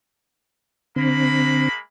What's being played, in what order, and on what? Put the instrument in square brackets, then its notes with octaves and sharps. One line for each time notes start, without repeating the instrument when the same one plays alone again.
[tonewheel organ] D3 C4 [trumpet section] G#3 A#3 B5